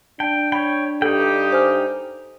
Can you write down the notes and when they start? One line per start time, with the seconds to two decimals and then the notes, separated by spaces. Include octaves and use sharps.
0.20 D4 G5 A5
0.52 C#5 G5 B5 B6
1.02 G2 D#4 G4 A4 G5
1.52 C5 G#5 F6